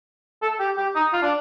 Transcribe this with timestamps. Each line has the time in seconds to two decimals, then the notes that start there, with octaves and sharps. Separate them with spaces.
0.42 A4
0.60 G4
0.77 G4
0.96 D#4
1.13 F4
1.23 D4